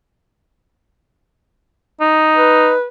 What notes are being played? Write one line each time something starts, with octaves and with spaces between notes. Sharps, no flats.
D#4
B4